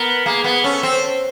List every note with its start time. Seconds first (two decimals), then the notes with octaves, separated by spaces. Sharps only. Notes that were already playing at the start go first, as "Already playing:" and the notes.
Already playing: B3 A#4
0.26 A#3 G#4
0.44 B3
0.64 C#4 A4
0.83 C4